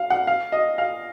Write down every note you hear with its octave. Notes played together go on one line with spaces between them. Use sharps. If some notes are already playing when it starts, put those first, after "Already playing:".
Already playing: F5
F#5
F5
D#5
F5